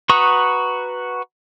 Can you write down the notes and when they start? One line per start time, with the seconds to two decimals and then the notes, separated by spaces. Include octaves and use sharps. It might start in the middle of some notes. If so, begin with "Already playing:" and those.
0.09 F#4 B4 A#5 C#6 D#6